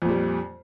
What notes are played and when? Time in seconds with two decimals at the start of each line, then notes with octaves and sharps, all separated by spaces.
0.02 F2
0.05 A#2
0.09 G3